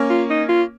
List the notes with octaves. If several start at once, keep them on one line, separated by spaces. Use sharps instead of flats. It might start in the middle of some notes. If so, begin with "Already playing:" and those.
Already playing: A#3 C#4
F4
D#4
F4